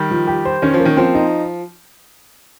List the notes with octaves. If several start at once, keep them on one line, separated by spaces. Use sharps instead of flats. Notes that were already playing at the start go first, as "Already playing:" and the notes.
Already playing: D#3 G3
F3
G4
C5
D#3 C#4
F3
A#3
D#3
F3 C4
D#4